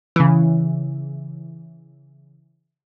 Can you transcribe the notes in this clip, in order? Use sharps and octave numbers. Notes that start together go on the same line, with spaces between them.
C#3 E3